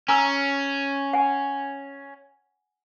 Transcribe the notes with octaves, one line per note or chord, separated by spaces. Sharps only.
C#4 G#5 A#5 E6
F#5 G#5